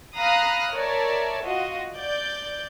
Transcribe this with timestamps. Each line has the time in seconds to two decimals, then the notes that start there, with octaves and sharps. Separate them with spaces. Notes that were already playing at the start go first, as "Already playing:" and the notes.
0.16 F5 A#5 B5 D#6 F6 F#6
0.73 A#4 C#5 D5 E5 A5
1.44 F4 F#4 D#5
1.95 D5 G6